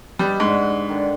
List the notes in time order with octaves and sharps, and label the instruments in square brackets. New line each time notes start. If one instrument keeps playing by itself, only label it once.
[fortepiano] G3 [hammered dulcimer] B4 D#5 A5
[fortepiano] G#2 [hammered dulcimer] D4 F#5
[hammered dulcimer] D3 D#3